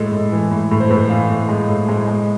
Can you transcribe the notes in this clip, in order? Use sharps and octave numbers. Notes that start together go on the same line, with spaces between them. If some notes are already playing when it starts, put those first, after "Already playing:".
Already playing: A2 G#3 A4
A2
E3
A2
A2
C5
A2 B4
E3 F5
A2
G#3
A2
G#3
G#3